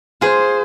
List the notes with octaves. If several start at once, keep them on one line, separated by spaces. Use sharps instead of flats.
F4 G#4 C5